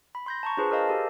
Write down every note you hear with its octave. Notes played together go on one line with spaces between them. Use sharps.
B5
C6 G6 A#6
A5 A#5 C#6
D4 F4 G#4 B4 C5
G#4 A#4 C5 D#5 F5 A5
G4 A4